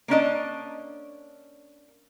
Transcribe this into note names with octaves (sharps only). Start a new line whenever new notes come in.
A#3 C#4 D4 D#5